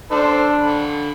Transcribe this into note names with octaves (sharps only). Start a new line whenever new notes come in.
D4 A4 C5
D3 B5